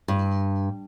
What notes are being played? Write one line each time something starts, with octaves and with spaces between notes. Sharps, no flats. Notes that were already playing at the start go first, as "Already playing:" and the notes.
G2